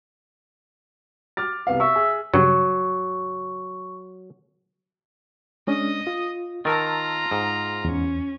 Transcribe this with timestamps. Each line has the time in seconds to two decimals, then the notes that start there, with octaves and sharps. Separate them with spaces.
1.37 D6 F6 A6
1.67 C2 B3 F5
1.80 E5 C#6
1.96 G#4
2.34 G2 C#3 F#3 C#6
5.67 G#3 C#4 D4 D#5 D#6
6.07 F4
6.65 D#3 F4 A#4 A5 A#5 E6 A6
7.31 G#2
7.85 E2 C#4